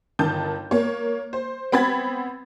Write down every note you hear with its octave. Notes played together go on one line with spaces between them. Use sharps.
G1 D#3 A5 G6
A#3 C#5
C5
B3 C4 B5 G#6 A6